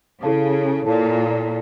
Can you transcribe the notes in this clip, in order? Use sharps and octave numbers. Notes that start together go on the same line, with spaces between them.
C#3 E4 A4 C#5 F5 A5
A#2 E4 A4 C#5 F5 A5